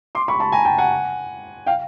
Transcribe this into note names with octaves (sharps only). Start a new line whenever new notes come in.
C6 D6
B5 C#6
A5 B5
G#5 A#5
G5 A5
F#5 G#5
F5 G5